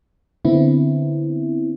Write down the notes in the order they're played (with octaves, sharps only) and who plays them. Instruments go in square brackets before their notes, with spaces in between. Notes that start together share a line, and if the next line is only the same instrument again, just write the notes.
[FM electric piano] D3 B3 C4 E4